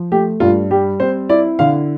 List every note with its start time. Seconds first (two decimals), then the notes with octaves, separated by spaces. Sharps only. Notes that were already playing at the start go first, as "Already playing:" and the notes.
Already playing: F3
0.12 A3 G4
0.40 G2 F4
0.71 G3 G4
1.00 C4 C5
1.29 E4 D5
1.59 D3 F5